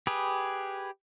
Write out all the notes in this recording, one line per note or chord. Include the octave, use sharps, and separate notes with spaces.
G4 G#4 B4